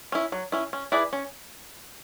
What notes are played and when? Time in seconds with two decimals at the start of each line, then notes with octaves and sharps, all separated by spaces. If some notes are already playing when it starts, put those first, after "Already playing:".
0.12 C#4 E4
0.32 F#3
0.52 C#4 E4
0.73 C#4
0.92 E4 G#4 B4 D5
1.13 C#4